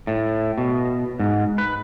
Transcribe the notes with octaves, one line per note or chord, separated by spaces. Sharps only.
A2
B2
G#2
B4